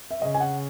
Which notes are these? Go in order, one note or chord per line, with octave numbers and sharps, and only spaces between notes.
E5
C#3 D#5
G#5
F#5